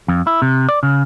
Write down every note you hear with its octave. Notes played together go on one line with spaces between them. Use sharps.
F2
E4
C3
D5
C#3